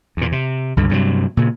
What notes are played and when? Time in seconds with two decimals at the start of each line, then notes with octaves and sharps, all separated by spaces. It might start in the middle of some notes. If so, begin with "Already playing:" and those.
0.17 E2 A#2
0.32 C3
0.77 C#2 G2 D3
0.90 G2 C3 E3 F#3
1.37 A#2 C#3